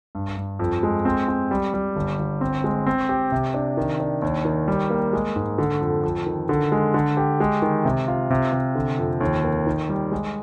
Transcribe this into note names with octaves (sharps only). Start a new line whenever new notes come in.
G2
G2
F2
G#3
C4
C4
G3
G3
G1
G1
C4
G#3
C4
G4
C3
D4
D#3
D4
D#2
D#3
G3
A#3
G#3
G#2
D3
F2
F2
D#3
D3
G#3
D3
G4
G#3
D#3
C3
F4
C3
C3
D3
F2
D#2
A#3
D#3
G3
G#3